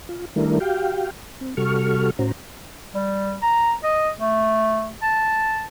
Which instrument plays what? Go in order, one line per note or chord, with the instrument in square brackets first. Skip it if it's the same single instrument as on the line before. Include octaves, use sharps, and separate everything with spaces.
[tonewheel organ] F4
D#3 G3 A3 D4 E4 A#4
F#4 G4 F5 G5
C4
C3 G3 F#4 A4 C#6 F6
A2 C#4 F#4 C5 A#5
[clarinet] G3
A#5
D#5
A3
A5